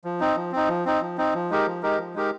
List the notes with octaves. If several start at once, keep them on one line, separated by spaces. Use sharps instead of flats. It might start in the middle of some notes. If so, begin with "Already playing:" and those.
F3
C4 D#4
F3
C4 D#4
F3
C4 D#4
F3
C4 D#4
F3
G#3 D#4 G4 A#4
F3
G#3 D#4 G4 A#4
F3
G#3 D#4 G4 A#4